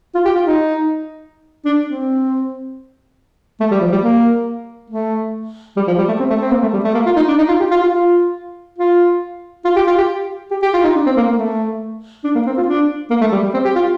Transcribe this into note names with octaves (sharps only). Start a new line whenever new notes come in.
F4
G4
F4
D#4
D4
C4
A3
G3
F3
G3
A#3
A3
G3
F3
G3
A3
C4
A3
C4
A#3
A3
G3
A3
A#3
F4
D#4
D4
D#4
F4
G4
F4
F4
F4
F4
F4
G4
F4
G4
G4
G4
F4
D#4
D4
C4
A#3
A#3
A3
D4
A#3
C4
F4
D4
A#3
A3
G3
G3
C4
G4
F4